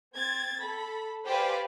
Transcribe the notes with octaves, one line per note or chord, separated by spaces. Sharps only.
C4 G#6 A6
A4 B5
G4 B4 C5 D5 F5 G#5